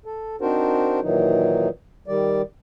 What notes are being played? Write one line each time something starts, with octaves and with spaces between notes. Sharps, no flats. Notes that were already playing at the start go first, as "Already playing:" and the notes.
A4
C4 D4 D#4 F#4 A#4 C5
A#2 D#3 E3 F#3 D#4
D#3 G3 D5